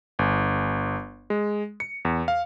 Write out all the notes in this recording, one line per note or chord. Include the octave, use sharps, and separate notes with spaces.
G1
G#3
C#7
E2
F5